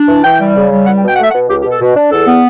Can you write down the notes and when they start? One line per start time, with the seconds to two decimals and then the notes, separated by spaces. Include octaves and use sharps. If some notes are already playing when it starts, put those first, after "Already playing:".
Already playing: D4
0.08 E3
0.24 E3 G5
0.40 G3
0.55 C#3
0.71 G3
0.87 C#2 F#5
0.97 G5
1.02 B2
1.08 G5
1.15 A3 F#5
1.23 E5
1.31 B2 F#5
1.49 C#2 G4
1.60 G4
1.65 B2
1.71 A4
1.80 B2
1.96 D4
2.12 E2 A4
2.27 B3